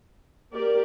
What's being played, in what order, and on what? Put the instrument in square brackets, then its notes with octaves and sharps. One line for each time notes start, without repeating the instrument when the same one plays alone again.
[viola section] A#3 G4 A#4 D5